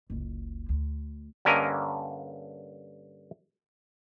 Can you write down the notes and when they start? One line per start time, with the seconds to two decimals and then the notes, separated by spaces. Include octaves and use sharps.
0.10 F#1 C#2
0.69 D2
1.45 G2 D3 A#3 C#4 A#4 D#5